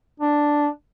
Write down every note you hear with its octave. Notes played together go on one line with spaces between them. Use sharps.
D4